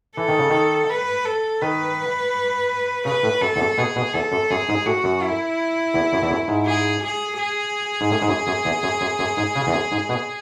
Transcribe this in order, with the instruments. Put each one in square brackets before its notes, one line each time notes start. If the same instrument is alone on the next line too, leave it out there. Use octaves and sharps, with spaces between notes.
[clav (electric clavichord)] E3 [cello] A4
[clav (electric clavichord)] D#3
C#3
D#3
[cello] B4
A4
[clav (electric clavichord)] D#3 [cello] B4
[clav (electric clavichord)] C#3 [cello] B4
[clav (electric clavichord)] A2
[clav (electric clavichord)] F#2 [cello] A4
[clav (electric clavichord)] E2
F#2
[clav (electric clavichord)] B2 [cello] G#4
[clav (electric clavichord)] B2
[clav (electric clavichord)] E2 [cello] A4
[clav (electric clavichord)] F#2
[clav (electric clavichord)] F#2 [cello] G#4
[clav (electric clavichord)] G#2
[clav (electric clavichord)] A2 [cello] F#4
[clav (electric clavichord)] F#2
[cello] E4
[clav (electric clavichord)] E2
F#2
E2
F#2
G#2
[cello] G#4
G#4
G#4
[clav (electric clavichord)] G#2
A2
G#2
F#2
F#2
E2
F#2
F#2
F#2
G#2
C#3
E2
F#2
G#2
B2